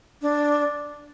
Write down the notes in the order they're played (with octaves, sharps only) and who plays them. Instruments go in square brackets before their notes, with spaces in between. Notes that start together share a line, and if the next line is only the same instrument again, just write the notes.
[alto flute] D4